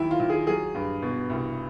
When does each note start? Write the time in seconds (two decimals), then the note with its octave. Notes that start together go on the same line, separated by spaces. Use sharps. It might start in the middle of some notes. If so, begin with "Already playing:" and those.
Already playing: D#2 F#3 E4
0.11 F4
0.20 D#2
0.30 G#4
0.47 F#3 G#4
0.75 G2
1.02 B2
1.30 C2